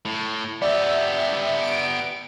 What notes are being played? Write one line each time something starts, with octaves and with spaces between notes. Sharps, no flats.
A2
B3 G4 D5 E5
D7